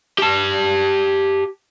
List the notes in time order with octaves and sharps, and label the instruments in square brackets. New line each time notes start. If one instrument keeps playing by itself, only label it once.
[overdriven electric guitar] G4 A5